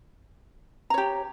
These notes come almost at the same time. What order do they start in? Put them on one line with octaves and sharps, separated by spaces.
A#5 C#5 G4